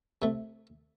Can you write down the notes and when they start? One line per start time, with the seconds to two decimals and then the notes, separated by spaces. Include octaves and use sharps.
0.22 C3 A3